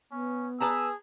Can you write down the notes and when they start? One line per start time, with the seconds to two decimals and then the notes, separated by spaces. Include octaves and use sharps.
0.11 B3 C#4
0.60 G#4 B4 A5 A#5 E6